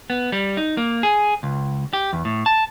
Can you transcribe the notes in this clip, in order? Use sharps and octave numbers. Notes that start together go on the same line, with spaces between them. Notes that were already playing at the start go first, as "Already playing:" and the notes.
B3
G3
D#4
A#3
G#4
C#2
G4
E2
A2
A5